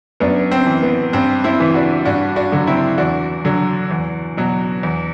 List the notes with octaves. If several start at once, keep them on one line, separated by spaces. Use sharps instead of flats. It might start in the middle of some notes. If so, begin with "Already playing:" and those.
F#2 B3 D4
C4
E3
B3
G2 C4
C4 E4
E3
D4 F#4
G2 D4 F#4
D4 F#4
D3 F#3
C4 E4
E2 D4 F#4
D3 F#3
E2
B2 F#3
E2